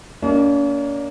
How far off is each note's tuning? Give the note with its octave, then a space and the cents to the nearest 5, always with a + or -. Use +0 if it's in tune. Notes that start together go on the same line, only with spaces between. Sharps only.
A#3 +0 C#4 +45 D5 +45